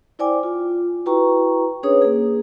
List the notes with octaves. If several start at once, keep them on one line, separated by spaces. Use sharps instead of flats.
E4 C5 D5 G5 G#5 D6
F4
E4 F#4 B4 G5 A#5 C#6
C#4 D4 G#4 B4 C#5 D#6
A#3 G#4